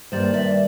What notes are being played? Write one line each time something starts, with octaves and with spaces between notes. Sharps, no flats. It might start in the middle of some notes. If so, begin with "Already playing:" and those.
G2 D#3 G3 A#3 C5 D5
D5 E5